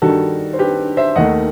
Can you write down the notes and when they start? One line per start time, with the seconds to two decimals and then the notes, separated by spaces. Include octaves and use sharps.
0.02 G2 D#3 G3 F#4 A4
0.53 C5
0.59 G4 B4
0.97 C5 E5
1.15 D#2 D#3 A3 D#5 F#5